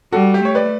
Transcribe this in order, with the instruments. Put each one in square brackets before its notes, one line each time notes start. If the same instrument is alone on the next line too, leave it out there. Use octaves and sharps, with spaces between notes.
[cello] G3 [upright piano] F#4 A4
[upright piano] G4
[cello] A3 [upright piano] C#5
[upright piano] B4 D5